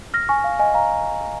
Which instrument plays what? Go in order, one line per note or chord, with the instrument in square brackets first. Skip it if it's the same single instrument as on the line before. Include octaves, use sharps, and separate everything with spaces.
[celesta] F6 A#6
G#5 C#6
F5
D#5 G#5
F5 A#5